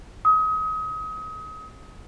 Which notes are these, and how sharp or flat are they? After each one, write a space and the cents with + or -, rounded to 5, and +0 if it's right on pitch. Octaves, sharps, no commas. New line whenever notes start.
D#6 +30